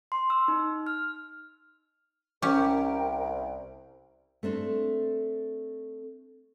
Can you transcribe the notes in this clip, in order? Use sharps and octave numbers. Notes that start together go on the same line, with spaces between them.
C6
E6
D#4
F6
C2 C#4 G4 A#4 G5
A3 C4 D4 A4